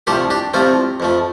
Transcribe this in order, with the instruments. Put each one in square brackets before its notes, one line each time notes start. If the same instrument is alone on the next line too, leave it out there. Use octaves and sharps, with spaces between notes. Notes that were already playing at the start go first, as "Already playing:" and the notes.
[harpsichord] C2 C3 F3 A3 G4 C5
D4 G4
C2 C3 F3 A3 C4 F4
F2 F3 A3